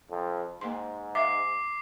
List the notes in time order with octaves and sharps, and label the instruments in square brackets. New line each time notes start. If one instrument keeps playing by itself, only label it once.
[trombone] F2
[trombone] G#2 [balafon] A#3 C6
[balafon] E5 F5 [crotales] D6 C7